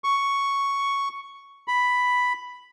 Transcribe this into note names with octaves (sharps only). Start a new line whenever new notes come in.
C#6
B5